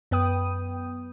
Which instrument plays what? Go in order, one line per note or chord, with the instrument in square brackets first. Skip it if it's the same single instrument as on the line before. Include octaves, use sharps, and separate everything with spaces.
[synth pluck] F#2 B3 B4 G5 D#6